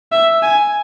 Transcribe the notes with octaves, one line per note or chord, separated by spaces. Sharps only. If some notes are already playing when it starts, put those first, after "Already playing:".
E5
G#5